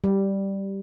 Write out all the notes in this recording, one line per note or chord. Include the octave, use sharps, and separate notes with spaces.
G3